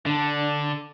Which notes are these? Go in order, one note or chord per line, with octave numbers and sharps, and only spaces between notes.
D3 D4